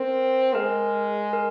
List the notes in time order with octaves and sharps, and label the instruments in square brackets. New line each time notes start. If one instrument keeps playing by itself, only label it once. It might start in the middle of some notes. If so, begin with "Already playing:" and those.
Already playing: [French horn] C4 [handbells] A#4
[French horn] G#3 [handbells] A#4
[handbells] A#4